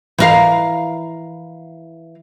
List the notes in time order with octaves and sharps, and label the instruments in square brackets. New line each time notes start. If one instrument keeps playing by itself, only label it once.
[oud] E3 A#4 F5